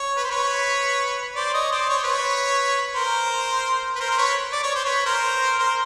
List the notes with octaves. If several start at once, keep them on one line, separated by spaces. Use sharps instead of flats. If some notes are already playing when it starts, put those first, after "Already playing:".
Already playing: C#5
B4
C5
B4 C#5
C5 D5
C#5 D#5
C5 D5
C#5
C5
B4 C#5
A#4 C5
B4
A#4 C5
C5
B4 C#5
D5
C#5
C5
B4 C#5
A#4 C5
A#4 C5